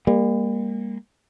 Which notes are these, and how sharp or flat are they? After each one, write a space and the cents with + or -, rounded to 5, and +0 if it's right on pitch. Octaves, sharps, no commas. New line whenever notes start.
G3 +45 A#3 +0